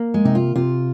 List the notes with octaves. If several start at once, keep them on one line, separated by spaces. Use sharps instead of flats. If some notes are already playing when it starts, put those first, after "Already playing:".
Already playing: A#3
G#3
C3 D#4
F4
C3 F4